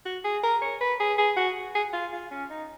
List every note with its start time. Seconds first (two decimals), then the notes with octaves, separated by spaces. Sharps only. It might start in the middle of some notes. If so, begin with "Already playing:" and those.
0.05 F#4
0.24 G#4
0.43 A#4
0.62 C#5
0.81 B4
1.00 G#4
1.18 G#4
1.37 F#4
1.75 G#4
1.93 F4
2.13 F4
2.31 C#4
2.50 D#4